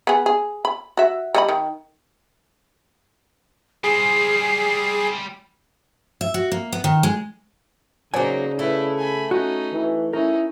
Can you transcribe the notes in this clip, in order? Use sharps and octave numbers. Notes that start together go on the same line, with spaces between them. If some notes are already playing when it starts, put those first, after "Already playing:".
B3 G#4
G#4
B5
F#4 E5
G3 D#5 B5
D#3
G3 G#4 C5 C7
E5
F#4
A#3
B3
D#3
G#3
C#3 F#3 A#3 D#4 C5 D5 G#5
A3 E4 B4
G#5 B5
C#4 D#4 F#4
E3
C#4 D#4 E4 A#4